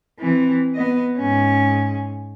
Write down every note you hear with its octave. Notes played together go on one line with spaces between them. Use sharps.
E3 C4
B3 D#5
G#2 C#4